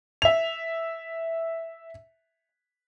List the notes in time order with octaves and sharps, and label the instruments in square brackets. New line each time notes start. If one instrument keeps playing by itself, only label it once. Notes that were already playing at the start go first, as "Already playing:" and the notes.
[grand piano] E5 F7